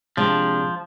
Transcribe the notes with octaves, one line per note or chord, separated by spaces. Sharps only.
C3 F3 G#3 D4